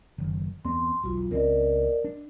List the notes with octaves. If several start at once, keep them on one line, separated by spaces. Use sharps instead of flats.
F#1 D#3
E2 B3 C4 C6
E1 B1 F4 F#4
C#2 C4 C#4 A#4 D5 D#5
D4